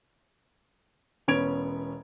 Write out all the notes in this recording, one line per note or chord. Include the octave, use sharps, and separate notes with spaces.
E1 B3 C#4 G#6 D7 F7